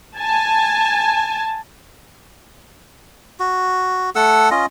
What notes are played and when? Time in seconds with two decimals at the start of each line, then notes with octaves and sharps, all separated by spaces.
0.17 G#5 A5
3.40 F#4
4.15 A3 A4 F#5 E6
4.51 C#4 F4 D#5